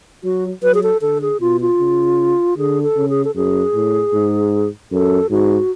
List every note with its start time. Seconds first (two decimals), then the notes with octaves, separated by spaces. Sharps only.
0.24 F#3 F#4
0.63 F#3 B4
0.74 G#4
0.83 A4
1.01 D3 A4
1.22 G#4
1.40 B2 F4
1.61 F4
1.79 C#3
2.57 D3 G#4
2.83 A4
2.97 C#3
3.09 G#4
3.25 A4
3.36 F#2 G#4
3.74 A2
4.13 G#2
4.92 F#2 A4
5.30 G#2 F#4